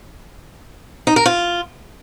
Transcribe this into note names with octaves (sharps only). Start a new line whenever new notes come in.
D#4
A#4
F4